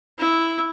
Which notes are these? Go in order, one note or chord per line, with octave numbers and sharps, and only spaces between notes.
E4